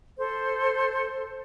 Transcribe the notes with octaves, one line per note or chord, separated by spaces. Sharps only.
A4 C5